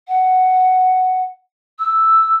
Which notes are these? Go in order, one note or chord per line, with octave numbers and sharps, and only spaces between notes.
F#5
E6